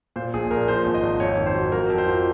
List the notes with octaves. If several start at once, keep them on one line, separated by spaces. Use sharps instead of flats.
A#2 C5
A#1 G#4
A#1 A#4
F3 C5
G#1
D#5
G#1
F2 C#5
D#3
C5
F#3
F2 A#4
F2
C5
F3